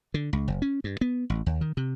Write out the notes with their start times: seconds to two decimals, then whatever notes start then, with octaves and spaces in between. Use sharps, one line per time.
0.14 D3
0.33 C#2
0.48 F#1
0.62 C#4
0.84 G2
1.01 B3
1.30 A1
1.46 D#2
1.61 D#3
1.77 C3